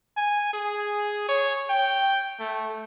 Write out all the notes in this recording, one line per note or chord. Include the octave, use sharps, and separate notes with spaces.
G#5
G#4
C#5
G5
A3